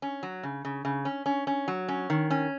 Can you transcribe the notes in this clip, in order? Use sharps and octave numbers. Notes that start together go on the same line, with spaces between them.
C#4
F#3
C#3
C#3
C#3
C#4
C#4
C#4
F#3
C#4
D#3
C#4